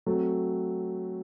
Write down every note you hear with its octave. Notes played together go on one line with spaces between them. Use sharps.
F#3 A3 C4 F#4